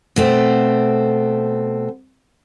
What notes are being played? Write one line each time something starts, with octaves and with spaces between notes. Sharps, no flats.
B2 A3 C4